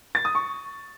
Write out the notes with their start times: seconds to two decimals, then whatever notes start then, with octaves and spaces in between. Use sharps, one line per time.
0.15 A6
0.25 D#6
0.35 C#6